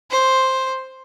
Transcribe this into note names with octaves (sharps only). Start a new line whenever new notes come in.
C5